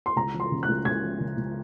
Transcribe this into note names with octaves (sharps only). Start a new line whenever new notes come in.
C6
C#2 A#5
F3
C6
C#3
F#6
C#2
C#2 G#6
F3
C#3
C#2